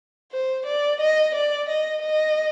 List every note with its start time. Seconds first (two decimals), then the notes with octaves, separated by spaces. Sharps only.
0.32 C5
0.66 D5
1.00 D#5
1.35 D5
1.69 D#5
2.02 D#5